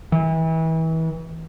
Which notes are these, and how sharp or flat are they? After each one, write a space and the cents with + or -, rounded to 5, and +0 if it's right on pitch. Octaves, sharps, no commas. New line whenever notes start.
E3 -30